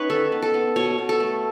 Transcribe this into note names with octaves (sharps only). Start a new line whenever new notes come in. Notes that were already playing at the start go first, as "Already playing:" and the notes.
Already playing: B3 C#4 D#4 B4 C#5
D#3 A4
B3
A4
B3
B2 C#5
B2
A4
A3